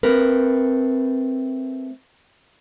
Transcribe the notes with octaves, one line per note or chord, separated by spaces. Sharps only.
A3 C4 A#4 B4